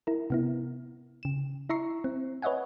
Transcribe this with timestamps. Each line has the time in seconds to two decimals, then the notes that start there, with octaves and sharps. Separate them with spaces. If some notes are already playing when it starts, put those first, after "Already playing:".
0.07 E4 A#4
0.30 C3 B3 E4
1.23 C#3 E7
1.69 E4 E5 A#5 C#6 C7
2.04 C4
2.42 B4 C#5 D#5 E5 F#5 G#5